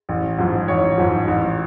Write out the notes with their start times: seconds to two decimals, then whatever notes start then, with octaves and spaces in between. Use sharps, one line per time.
0.09 A1
0.38 G#2 F3
0.68 A1 C#5
0.98 G#2 F3
1.28 A1